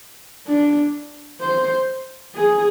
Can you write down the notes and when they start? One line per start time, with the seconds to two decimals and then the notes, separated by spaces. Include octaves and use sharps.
0.47 D4
1.41 C5
2.35 G#4